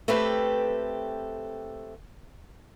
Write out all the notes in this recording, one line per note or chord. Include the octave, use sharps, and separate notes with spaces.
A3 C4 G4 A4 B4